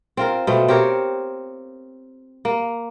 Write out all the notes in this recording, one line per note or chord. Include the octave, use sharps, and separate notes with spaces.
C4 F4 A#4
B2 A3 C4
C4 G4 A#4 C#5
A#3